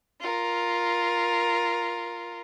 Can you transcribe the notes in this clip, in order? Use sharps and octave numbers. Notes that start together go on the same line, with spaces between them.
F4 A#4